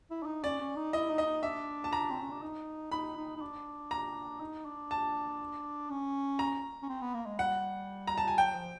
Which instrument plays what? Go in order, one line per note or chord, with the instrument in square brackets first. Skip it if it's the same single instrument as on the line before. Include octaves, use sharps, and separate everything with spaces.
[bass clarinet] E4
D4
D#4
[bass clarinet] C#4 [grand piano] D5
[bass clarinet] C#4
D#4
[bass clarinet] E4 [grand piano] D#5
[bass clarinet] D#4
[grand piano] D#5
[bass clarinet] D#4
[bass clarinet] D4 [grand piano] E5
[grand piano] A5
A#5
[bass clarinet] C4
C#4
D4
D#4
[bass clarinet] D#4 [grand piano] B5
[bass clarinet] D#4
D#4
D4
[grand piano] A#5
[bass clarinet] D#4
D4
[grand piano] A5
[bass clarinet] C#4
[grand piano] A#5
[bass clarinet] C#4
C4
B3
A#3
G#3
[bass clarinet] G3 [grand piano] F#5
[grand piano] A#5
A5
G#5
[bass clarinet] F#3 [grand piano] G5
[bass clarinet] F3